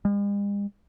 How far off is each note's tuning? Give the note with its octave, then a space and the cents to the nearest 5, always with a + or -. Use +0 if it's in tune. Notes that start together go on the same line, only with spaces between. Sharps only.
G#3 -45